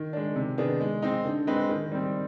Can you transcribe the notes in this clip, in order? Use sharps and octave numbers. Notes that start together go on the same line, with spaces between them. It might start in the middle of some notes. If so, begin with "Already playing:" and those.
Already playing: D#3
G#3 D4
C3
D#3 B3 D4 G#4
G#3
C4 D#4
D3
G#3 C4 D#4 B4
D#3
G3 C4